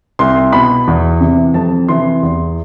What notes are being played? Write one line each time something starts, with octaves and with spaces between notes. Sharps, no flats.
C2 C6
B2 B5
E2
C3 E3
F2 A5
C3 E3 C6
E2